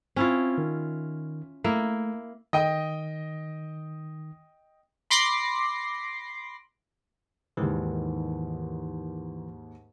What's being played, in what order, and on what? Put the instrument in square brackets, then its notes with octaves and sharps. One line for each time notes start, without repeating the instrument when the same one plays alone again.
[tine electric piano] C4 [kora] C#4 E4 F4
[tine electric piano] D#3
[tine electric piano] A3 [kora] A#3 E4
[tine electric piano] D#3 [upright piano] D#5 G5 D#6
[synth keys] B5 C6 D6 A#6 C7
[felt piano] D#2 G#2 [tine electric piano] D#3 E3